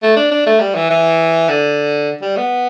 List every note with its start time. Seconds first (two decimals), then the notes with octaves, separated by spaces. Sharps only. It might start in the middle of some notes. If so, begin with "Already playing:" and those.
0.03 A3
0.16 D4
0.31 D4
0.46 A3
0.60 G3
0.75 E3
0.90 E3
1.49 D3
2.22 G3
2.37 B3